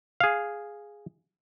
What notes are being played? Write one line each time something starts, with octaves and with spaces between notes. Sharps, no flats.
G#4 F5